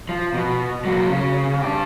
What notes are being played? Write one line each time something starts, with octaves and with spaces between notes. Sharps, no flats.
F3
B2
F#3 A#3
C#3
D4 G4